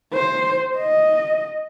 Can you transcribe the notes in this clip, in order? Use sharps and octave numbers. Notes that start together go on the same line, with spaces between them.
C5
D#5